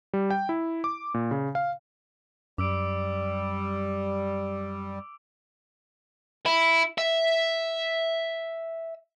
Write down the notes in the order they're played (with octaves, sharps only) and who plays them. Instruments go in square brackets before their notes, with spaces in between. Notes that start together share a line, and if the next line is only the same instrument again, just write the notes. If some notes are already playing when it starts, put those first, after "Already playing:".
[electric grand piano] G3
G5
E4
D6
A#2
C#3
F5
[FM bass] F#2 [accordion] G3 [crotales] D6 E6 D7
[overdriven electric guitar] E4
E5